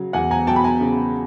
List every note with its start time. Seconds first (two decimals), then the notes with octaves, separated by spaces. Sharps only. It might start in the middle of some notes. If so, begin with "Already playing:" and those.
Already playing: C#3 F#3
0.13 E2 F#5 G#5
0.31 G#5 A#5
0.47 F#3 G5 A5
0.56 B5
0.64 G#5 A#5
0.81 C#3